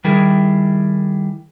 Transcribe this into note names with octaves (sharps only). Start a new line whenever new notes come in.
D#3 G3 E4 G#4 A#4